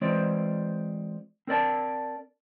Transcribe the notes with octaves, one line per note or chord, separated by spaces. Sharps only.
E3 G#3 C4 F4 C5 D5
C4 A#4 D5 A5